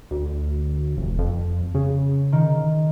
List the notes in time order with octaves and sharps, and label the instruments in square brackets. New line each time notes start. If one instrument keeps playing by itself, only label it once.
[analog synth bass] D2
F1
F2
C#3
[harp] D#3